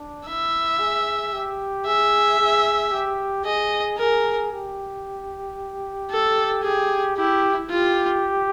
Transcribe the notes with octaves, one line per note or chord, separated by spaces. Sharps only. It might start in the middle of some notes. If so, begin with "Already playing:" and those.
Already playing: D4
E4 E5
G#4
G4
G#4 E5
G#4
G4
G#4 D#5
G#4 A#4
G4
A4
G4 G#4
E4 G4
F4 G4